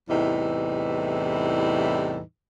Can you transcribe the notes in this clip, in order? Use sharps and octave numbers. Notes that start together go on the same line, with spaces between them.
E2 A2 C3 E3 G3 D#4